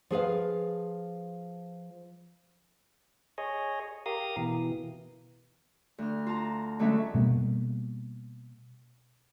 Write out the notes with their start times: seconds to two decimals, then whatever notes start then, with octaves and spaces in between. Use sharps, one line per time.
0.11 F3 G#4 B4 F5
3.38 G#4 C#5 D#5
4.06 G4 A#4 F5 D#6
4.37 B2 E3
5.98 D2 F6
6.26 F4 A5 A#5
6.79 D3 F#3 G#3 A3 C#4 E5
7.14 B2 G3 A3 A#3